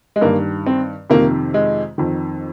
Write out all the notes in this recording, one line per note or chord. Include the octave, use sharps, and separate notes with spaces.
G#3
G2 D#3 A#3
C4
F2 C3 D#3 A#3
G#3
F2 D#3